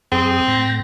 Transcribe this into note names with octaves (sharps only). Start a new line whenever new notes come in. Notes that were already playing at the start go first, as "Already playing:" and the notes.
F#2 C4 G#4 D#6
A2 G5 A#6